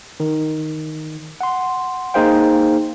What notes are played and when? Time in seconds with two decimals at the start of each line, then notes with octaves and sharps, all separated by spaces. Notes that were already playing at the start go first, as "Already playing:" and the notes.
0.20 D#3
1.41 F#5 C6
2.14 A#3 D#4 G#4 C5 F5 G5